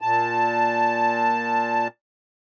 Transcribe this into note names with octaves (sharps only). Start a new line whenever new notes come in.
A#2 A5